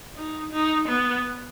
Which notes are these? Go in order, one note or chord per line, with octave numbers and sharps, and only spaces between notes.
D#4
D#4
B3